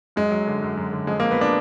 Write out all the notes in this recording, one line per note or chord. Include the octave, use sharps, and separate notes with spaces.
F#2 G#3
F#3
D3
F#2
F#2
D3
F2 G#3
A#3
F2
B3
D4